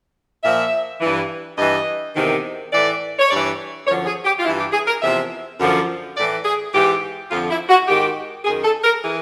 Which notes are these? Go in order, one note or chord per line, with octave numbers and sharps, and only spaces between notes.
A#2 F3 E5
G2 E3
G2 E3 D#5
E2 C3 D#3
A2 E3 D5
C#5
G2 E3 D5
F#2 D3 F3 C#5
G#4
G4
F4
G2 E3 E4
G4
G#4
A#4
E2 C3 F3 E5
F#2 D3 F3
A2 E3 D5
G#4
G#2 E3 G4
F2 D3 F3 F4
E4
F#4
G#2 D#3 G4
F#2 D#3 G#4
A4
A#4
E3 G#4